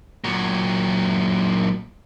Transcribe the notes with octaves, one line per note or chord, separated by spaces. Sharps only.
A#2 F#3